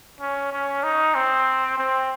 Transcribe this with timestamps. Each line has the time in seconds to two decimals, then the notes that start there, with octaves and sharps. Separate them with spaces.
0.21 C#4
0.53 C#4
0.83 D#4
1.15 C4
1.78 C4